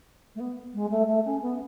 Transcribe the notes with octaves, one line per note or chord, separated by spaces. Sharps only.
A3
B3
G#3
A3
A3
C#4
B3